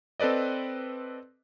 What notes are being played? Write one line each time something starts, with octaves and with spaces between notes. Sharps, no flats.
C4 A4 B4 D5 D#5